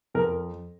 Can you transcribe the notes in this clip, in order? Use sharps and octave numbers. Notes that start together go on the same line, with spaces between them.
F2 A#4